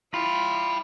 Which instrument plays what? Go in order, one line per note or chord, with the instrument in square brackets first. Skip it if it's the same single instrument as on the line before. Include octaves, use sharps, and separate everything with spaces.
[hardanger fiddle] E4 [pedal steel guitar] F4 [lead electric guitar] G5 B5